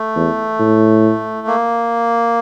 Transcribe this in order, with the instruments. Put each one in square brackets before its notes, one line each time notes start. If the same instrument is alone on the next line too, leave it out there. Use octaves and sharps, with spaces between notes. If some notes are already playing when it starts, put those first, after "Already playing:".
Already playing: [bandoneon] A3
[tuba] E2
A2
[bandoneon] A#3